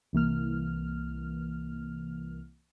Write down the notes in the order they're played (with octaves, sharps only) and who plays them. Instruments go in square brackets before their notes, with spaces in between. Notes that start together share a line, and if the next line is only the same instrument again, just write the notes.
[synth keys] C2 E3 A#3 F6